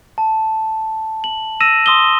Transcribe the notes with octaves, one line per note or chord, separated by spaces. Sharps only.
A5
F#7
E6 A#6 D#7 E7
C6 D#6 E6 G7